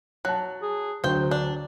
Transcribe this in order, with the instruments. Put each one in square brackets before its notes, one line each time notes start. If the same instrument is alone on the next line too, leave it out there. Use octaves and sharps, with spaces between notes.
[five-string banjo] F#3 [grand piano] A5 F#6
[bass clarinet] G#4
[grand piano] D2 [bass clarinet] F#3 [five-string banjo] C5 G5
[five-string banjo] D4